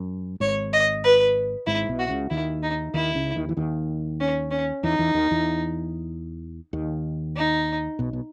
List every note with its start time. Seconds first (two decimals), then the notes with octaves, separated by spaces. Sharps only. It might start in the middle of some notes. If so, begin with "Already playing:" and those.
Already playing: F#2
0.40 G#1 G#2 C#5
0.73 D#5
1.04 B4
1.67 G#1 G#2 E4
1.88 B1 B2
1.99 F#4
2.09 C#2 C#3
2.30 D#2 D#3 E4
2.63 D#4
2.94 D#2 D#3 E4
3.15 C#2 C#3
3.36 D#2 D#3
3.49 E3
3.57 D#2 D#3
4.20 C#4
4.51 C#4
4.83 E2 E3 D#4
4.99 E2 E3
5.14 D#2 D#3
5.31 E2 E3
6.73 D#2 D#3
7.36 D#4
7.99 B1 B2
8.13 B2